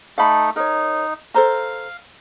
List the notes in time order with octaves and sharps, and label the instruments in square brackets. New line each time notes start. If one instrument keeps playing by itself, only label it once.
[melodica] A3 D#4 A4 [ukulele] F5 B5
[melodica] D#4 [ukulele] A#4 C#5
[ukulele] A4 C5 A#5 [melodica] F5